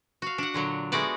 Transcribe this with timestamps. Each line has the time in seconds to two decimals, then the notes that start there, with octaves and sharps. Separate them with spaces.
0.22 F#4 F5
0.38 D4 F#5
0.54 A#2 D3 F#3
0.92 G#3 A3 B3 F#4 D5 F#5